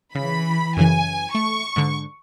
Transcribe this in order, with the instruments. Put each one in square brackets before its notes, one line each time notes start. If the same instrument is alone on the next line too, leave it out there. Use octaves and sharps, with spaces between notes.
[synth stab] C#3 [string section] E3 B5
[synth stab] F#2 C#3 E3 [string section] G#5
[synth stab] A3 [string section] C#6
[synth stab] G#2 D3